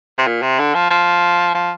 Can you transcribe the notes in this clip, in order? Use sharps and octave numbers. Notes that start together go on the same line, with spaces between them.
C3
A#2
C3
D3
F3
F3
F3